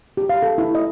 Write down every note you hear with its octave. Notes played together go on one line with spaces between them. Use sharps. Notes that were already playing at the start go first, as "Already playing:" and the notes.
G4
F5
A4
E4
D#5